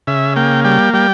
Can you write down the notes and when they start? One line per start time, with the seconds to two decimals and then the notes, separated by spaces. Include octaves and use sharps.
0.07 C#3 E5
0.36 A#3 G5
0.64 G3 G5
0.93 G3 G5